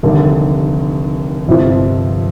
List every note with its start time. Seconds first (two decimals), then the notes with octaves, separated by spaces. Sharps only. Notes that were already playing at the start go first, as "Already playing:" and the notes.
0.03 F1 D#2 D3 G3
1.47 G1 F2 C3 F3